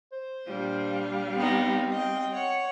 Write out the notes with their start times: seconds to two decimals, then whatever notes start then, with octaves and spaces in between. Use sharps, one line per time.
0.12 C5
0.47 A#2 G3 D4 F5
1.35 B3 C4 D#4
1.91 D#5 G5
2.31 C#5 F#5